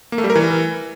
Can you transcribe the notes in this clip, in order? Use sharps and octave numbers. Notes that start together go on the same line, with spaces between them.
A#3
A3
G3
A#4
E3